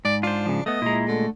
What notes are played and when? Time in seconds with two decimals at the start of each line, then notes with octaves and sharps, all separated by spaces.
0.05 G#2 D5
0.23 D4 F4 C5
0.46 C#3 F3
0.66 A3 B3 D#5
0.82 A#2 G#3 E4 A#5
1.08 D3 A3